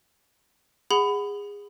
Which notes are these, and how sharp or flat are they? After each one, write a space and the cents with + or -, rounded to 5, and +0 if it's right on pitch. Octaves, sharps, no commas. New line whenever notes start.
G#4 -25 F#5 +0 B5 +20